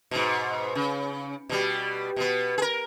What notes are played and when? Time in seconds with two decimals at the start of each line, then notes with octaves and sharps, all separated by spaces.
0.11 G#2 B2
0.75 C#3
1.49 B2 G3
2.16 B2 B3
2.58 G#4 A#4